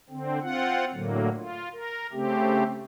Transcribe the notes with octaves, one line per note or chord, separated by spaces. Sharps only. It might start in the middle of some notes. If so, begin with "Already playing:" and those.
D3 C4
C4 F4 F#5
A2 D3 F#3 A#3
F4
A#4
C#3 A3 C4 G4